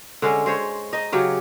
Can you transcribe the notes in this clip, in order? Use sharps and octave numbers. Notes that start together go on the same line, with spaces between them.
D3 G#3 C#4
G#3 C5 C#5
D#4 D#5
C#3 F#3 G4